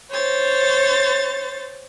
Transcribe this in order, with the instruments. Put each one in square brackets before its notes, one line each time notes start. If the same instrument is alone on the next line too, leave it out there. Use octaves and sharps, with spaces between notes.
[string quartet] C5 C#5 A6